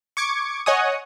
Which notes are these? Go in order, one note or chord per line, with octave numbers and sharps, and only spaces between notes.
C#6 D6 G#6 C#7
C#5 D#5 F#5 G#5 C#6 D#6